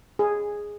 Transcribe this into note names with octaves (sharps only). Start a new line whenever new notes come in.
G#4